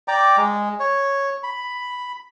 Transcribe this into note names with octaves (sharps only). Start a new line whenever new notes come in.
D5 G5 A#5 D6
G#3
C#5
B5